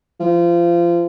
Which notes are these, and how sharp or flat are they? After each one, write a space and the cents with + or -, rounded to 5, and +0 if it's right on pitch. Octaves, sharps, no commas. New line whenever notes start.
F3 -25